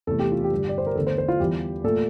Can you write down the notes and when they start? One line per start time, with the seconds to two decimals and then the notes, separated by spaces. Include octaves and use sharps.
0.07 E2 C3 E3 A3 A4
0.19 G4
0.32 F4
0.44 G4
0.51 G2 D3 G3
0.69 D5
0.78 C5
0.87 A#4
0.95 E2 D3 A3 A4
1.07 C5
1.18 C5
1.28 F4
1.40 E2 E3 G3 G4
1.84 A#2 A3 A4